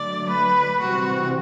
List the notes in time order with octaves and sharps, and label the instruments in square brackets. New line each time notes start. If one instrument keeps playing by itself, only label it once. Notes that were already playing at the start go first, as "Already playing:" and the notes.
Already playing: [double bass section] D3 F#3 A3 [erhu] D5
[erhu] B4
[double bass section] C3 E3 G3 C4 [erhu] F#4